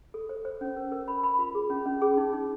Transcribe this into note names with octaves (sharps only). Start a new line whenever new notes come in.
A4
C5
C5
C#4
A#4
A#4
B5
B5
F4
G#4
C#4
C#4
G#4
D#4
D#4